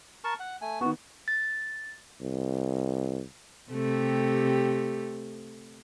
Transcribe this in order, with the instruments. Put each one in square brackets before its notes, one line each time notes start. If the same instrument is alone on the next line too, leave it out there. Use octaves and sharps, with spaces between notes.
[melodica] A#4 A5 C#6
F#5
A3 G#5
[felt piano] D#3 B3 [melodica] F#4
[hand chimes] A6
[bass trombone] C2
[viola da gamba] C3 A3 G4